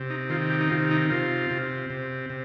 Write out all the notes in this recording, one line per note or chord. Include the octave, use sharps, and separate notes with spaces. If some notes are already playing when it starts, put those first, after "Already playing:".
Already playing: C3
D#4
D#3 F4
G4
D#4
C3 F4
D#4
C3 F4
C3
C3
C3